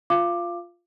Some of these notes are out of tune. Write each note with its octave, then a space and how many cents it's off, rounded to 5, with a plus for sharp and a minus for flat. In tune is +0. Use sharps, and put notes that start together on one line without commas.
F4 +0 F5 -25 D6 +10